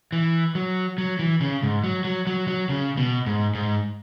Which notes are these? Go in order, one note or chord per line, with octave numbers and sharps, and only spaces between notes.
E3
F#3
F#3
E3
C#3
G#2
F#3
F#3
F#3
F#3
C#3
B2
G#2
G#2